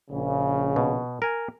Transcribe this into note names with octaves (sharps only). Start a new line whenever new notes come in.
A#1 C#3
B2
A#4 G#5